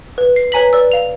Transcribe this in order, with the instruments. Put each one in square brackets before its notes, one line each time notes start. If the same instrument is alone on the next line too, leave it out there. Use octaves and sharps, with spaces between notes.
[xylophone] B4
C7
B4 C#5 G#5 A#5 B6 F#7
B4 D5 E6
F5 F7